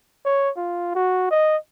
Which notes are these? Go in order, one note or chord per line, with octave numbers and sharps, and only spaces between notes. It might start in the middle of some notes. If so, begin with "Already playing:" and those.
C#5
F4
F#4
D#5